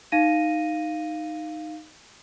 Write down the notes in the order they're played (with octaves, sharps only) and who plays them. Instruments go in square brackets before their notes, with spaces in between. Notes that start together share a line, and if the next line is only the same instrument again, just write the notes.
[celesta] D#4 F5 A#6 D#7